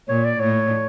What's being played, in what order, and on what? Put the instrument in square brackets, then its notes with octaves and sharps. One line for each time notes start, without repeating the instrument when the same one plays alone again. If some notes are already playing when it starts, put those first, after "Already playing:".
[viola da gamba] A#2 [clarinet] C#5
[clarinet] D5
[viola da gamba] A2 [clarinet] C#5